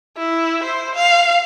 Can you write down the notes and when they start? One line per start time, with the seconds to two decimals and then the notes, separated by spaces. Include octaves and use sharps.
0.17 E4
0.63 C5
0.95 F5